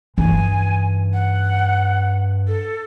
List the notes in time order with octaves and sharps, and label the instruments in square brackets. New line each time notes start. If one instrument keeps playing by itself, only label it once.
[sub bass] G2 [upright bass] E3 D#4 [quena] G#5
[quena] F#5
A4